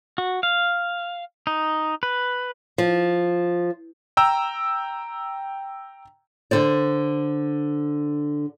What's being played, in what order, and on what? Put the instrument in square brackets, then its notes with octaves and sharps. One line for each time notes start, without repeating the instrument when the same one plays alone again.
[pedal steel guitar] F#4
F5
D#4
B4
[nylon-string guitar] F3
[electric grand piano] G5 A#5 E6
[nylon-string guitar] D3 C5 D5